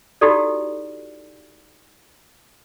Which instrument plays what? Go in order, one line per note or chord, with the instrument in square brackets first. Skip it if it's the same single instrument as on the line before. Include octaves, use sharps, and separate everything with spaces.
[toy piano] D#4 E4 F#4 G4 A4 D5